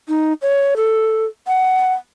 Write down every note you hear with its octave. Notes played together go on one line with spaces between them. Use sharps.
D#4
C#5
A4
F#5